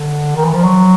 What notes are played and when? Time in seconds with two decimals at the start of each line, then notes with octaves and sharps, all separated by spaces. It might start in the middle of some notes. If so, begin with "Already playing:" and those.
Already playing: D3
0.35 D#3
0.45 E3
0.54 F3
0.63 F#3